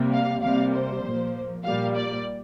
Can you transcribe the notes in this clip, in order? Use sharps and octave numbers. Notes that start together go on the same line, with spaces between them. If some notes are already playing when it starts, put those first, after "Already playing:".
Already playing: C3 G3 A#3
F5
C3 G3 A#3 F5
C5
A#2 F3 A#3
A#2 G3 A#3 F5
D5